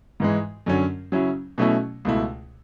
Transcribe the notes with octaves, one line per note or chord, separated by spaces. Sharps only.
G#2 E3 G#3
F#2 D3 F#3 C#4
C#3 F#3 C#4 E4
B2 F#3 A3 C#4 E4
C#2 B2 A3 E4